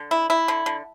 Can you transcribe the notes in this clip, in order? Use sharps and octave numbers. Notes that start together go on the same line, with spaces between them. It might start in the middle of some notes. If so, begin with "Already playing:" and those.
Already playing: D3
E4
E4
D3
D3